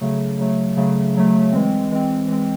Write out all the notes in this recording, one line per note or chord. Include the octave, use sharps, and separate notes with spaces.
C#3 F#3 A3
C#3 F#3 A3
C#3 F#3 A3
C#3 F#3 A3
E3 G#3 C4
E3 G#3 C4
E3 G#3 C4